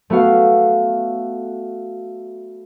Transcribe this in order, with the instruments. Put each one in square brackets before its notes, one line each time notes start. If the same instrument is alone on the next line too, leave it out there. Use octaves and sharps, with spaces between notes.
[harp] A3 B3 F#4 F5